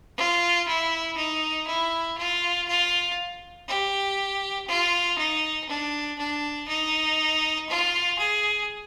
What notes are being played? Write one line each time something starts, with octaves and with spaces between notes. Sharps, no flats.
F4
E4
D#4
E4
F4
F4
G4
F4
D#4
D4
D4
D#4
F4
G#4